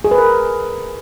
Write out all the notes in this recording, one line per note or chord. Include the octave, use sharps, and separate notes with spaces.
G#4
B4
A#4